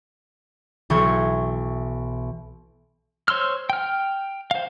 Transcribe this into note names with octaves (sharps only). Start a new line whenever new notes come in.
B1 E3 C#6 G6 G#6
C5 C#5 C6 E6 F6
G5 F6
C5 F5